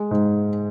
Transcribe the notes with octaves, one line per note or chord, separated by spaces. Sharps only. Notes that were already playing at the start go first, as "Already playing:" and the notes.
Already playing: G#3
G#2